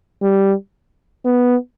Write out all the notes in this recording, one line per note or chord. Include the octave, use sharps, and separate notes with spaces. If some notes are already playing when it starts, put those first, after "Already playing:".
G3
B3